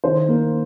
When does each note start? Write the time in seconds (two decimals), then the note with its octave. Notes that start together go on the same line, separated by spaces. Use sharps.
0.04 D#3 C5
0.29 A#3